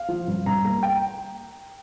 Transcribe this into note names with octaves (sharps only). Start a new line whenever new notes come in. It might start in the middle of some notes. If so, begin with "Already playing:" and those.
Already playing: F5
F3
G2
G2 A#5
A#3 A#5
G5